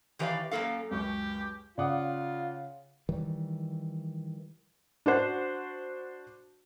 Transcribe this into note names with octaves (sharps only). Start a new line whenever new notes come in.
D#3 E3 G4 C#5 D5 F5
F#2 G3 A#3 A4 F5
C#2 F#2 G4 C#6
C#3 F4 D5 F#5 D6 D#6
D#3 E3 G3
D4 F#4 C5 F#5